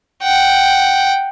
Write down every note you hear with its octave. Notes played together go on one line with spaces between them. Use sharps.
F#5 G5